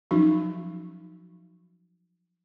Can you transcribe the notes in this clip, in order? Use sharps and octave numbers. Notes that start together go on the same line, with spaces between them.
F3 F#3 C#4 D#4 F#4